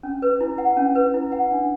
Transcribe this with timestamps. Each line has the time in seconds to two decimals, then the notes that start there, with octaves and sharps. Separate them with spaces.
0.03 C#4
0.22 B4
0.41 E4
0.58 F#5
0.77 C#4
0.95 B4
1.14 E4
1.32 F#5
1.51 D4